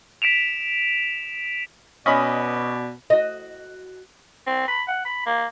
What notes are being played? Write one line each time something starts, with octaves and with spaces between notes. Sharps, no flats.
B6 D7 E7 F7
B2 C#4 D5 D#5 B5
F#4 D#5
C4
B5
F#5
B5
A#3